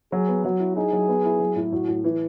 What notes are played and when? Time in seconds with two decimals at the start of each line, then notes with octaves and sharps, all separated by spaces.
0.12 F#3 G#4
0.28 B3
0.45 F#3 F#4
0.60 E4
0.76 D#4 G#4
0.93 F#3
1.08 B3
1.25 E4
1.40 F#3
1.56 A2
1.72 A2 F#4
1.88 A2
2.04 E3